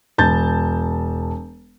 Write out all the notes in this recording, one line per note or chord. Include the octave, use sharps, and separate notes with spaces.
E1 A5 G6 A6